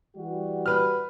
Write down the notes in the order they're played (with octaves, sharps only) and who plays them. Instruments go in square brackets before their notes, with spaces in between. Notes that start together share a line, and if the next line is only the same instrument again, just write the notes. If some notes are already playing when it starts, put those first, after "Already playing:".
[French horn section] E3 G3 F#4
[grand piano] B4 F6